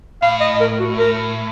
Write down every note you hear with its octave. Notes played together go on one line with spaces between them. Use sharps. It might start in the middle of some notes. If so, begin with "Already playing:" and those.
A2 F5
D#5
A#4
F#4
A#4